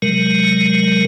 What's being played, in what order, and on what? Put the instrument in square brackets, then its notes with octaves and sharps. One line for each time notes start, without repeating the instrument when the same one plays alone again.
[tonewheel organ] C3 F#3 G#3 A#4